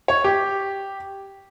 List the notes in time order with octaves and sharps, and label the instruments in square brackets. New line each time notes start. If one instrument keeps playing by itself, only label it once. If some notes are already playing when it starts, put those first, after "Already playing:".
[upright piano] C#5
G4